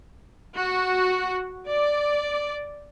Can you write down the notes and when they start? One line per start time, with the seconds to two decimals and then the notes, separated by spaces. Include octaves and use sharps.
0.54 F#4
1.66 D5